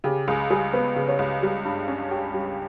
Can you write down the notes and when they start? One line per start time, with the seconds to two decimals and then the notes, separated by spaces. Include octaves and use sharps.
0.04 C#3 G4
0.28 C#2 G#4
0.50 G3 G#4
0.73 B3 B4
0.96 C#3
1.08 C#5
1.19 C#2
1.42 G3
1.65 G2
1.88 C#4
2.11 G4
2.34 G3